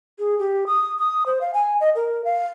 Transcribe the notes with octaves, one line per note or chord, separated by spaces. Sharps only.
G#4
G4
D#6
D#6
C5
F5
G#5
D#5
A#4
F5